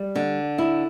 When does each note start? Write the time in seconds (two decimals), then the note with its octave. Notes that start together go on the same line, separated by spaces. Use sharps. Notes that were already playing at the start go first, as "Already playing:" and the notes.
Already playing: G3
0.15 D3
0.58 E4